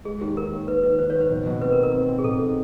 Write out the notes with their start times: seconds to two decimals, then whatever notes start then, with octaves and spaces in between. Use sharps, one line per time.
0.05 G#3 G#4
0.21 D#2 G4
0.36 D#2 A#4
0.52 D#2
0.67 D#2 B4
0.83 D#3 B4
0.99 D#3 C5
1.10 B4 C#5
1.15 D#2
1.21 C5
1.30 B2
1.46 B2
1.61 C4 B4
1.72 A#4
1.78 D#4
1.83 A#4
1.93 C4
2.09 C4
2.19 G#4
2.24 B2 A4
2.41 D#4